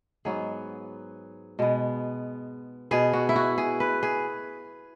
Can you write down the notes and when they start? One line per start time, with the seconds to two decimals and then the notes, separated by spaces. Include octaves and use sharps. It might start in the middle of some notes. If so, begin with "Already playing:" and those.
0.25 G#2 F#3 B3 G#4
1.59 B2 G#3 B3
2.91 B2 B3 G#4
3.13 F#4
3.29 E4
3.36 F#4
3.58 G#4
3.80 B4
4.03 G#4